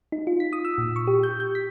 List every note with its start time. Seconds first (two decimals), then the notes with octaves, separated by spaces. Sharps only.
0.12 D#4
0.27 F4
0.40 B6
0.53 D#6
0.65 E6
0.78 A#2
0.96 C#6
1.07 G4
1.23 G6
1.40 G6
1.55 B6